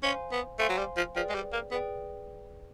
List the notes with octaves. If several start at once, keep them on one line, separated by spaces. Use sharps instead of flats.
C#4 C5 F5 G#5 C6
B3
A3 C5 F5 G#5 C6
F#3
G3
F3
F3 G#4 B4 D5 G5
G#3
G3
A#3
B3 G#4 B4 D5 G5